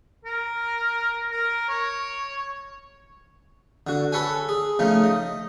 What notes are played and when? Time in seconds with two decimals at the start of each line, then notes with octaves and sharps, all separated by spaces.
0.25 A#4
1.32 A#4
1.69 C#5
3.87 D3 F#4
4.12 A4 B4 C#5 G#5
4.49 G#4
4.79 C#3 F3 A3 D#4
5.04 D#5